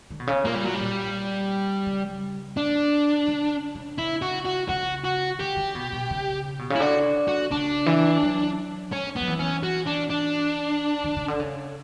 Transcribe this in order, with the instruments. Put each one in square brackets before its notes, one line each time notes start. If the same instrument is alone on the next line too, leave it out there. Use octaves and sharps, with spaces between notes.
[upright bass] D3
B2
C#3
[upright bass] A#2 [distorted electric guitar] A#3
[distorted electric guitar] G3
F#3
G3
[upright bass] A#2
C#3
[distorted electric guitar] D4
[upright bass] C#3
C#3
[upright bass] C#3 [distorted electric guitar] E4
[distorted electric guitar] F#4
F#4
[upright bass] C#3 [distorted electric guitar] F#4
[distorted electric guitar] F#4
[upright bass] D3 [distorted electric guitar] G4
[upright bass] D3
B2
B2
C#3
B2
C#3
[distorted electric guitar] E4
[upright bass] D3 [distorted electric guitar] F#4
[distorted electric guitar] F#4
[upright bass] C#3 [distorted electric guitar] D4
[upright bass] E3
F#3
[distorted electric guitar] C#4
B3
[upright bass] F#3
E3
[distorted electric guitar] C#4
F#4
D4
D4
[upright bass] D3
C#3
D3
C#3